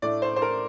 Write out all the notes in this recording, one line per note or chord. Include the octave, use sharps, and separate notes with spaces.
A2 A3 D4 D5
C5
C5
A#4